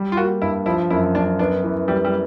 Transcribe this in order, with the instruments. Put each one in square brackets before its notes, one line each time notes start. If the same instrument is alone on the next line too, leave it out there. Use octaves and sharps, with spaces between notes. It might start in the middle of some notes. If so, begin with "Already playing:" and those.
Already playing: [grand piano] G3
[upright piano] F4
[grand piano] A#3 [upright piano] F#4
[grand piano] G2 [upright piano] E4
[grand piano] F3 [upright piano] E4
[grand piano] F#2 [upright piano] E4
[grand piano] F#2 [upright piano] D4
[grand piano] B3 [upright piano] D4
[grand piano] E3
[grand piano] E3 [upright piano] G3
[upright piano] G3